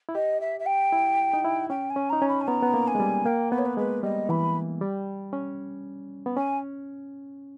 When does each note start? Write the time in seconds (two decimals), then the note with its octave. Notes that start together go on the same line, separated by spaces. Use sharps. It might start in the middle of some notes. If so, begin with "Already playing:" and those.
0.09 E4
0.14 G4 D#5
0.40 E5
0.59 E5
0.66 G5
0.92 E4
1.33 D#4
1.44 E4
1.69 C#4 G5
1.90 G#5
1.96 C#4
2.09 D#4 A#5
2.22 C#4
2.28 B5
2.41 G#5
2.47 B3 A#5
2.62 B3
2.74 A#3
2.87 G#5
2.95 G#3
3.00 G3
3.26 A#3 G5
3.51 B3 B4
3.58 C#5
3.65 B4
3.77 G#3 B4
4.03 G3 D#5
4.29 E3 B5
4.81 G3
5.33 C#4
6.26 B3
6.36 C#4 G#5